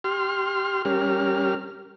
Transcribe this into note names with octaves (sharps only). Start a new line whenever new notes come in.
G4 C6 F6
G3 C#4 G4 A#4 F6